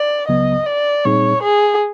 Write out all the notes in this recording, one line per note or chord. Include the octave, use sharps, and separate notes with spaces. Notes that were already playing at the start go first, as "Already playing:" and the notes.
Already playing: D5
C#2 C#3 F#3 B3 D#5
D5
A#2 G3 C4 D#4 G#4 C#5
G#4